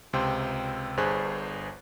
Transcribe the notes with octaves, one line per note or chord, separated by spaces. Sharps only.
C#2 C3 C4 G5 C6
G1 G2 G#4 C5 G#5 F#6